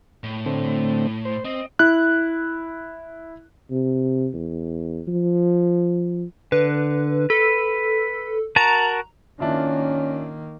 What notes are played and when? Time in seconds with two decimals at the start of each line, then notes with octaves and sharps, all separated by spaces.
0.24 A2
0.46 D3 A3 C4
1.25 C5
1.45 C4 D#5
1.79 E4 F#6
3.71 C3
4.34 E2
5.08 F3
6.52 D3 B4
7.30 A4 B4
8.56 F#4 A#4 A5 A#5
9.40 D#3 A#3 C#4 D4 E4 F4